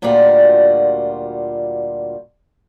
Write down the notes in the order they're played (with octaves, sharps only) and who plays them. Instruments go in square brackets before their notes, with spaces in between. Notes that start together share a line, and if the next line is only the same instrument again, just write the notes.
[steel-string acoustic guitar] D2 A#2 G3 F4 F#4